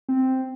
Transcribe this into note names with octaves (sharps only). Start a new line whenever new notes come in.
C4